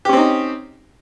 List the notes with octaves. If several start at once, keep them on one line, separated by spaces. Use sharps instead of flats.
C4 C#4 D#4 G4